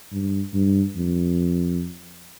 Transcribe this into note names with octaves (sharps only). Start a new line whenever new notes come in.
G2
G2
F2